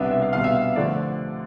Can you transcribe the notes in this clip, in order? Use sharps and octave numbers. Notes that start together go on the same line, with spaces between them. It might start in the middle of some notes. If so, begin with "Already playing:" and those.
Already playing: C2 B2 B3 D4 E5
E5
F5
C2 B2 B3 D4 F5
E5
F5
D3 F3 A3 D5